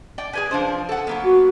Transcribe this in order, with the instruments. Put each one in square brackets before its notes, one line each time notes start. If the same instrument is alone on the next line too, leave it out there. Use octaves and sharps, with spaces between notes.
[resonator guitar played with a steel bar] D5 G5
G#4 B4 G#5
F3 D4 C5
A4 F#5
F#3 A#3 B3
[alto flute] F#4